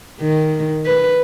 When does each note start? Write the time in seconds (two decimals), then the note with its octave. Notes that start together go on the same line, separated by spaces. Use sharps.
0.20 D#3
0.86 B4